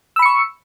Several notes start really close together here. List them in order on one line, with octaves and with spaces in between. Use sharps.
E6 B5 C#7 C#6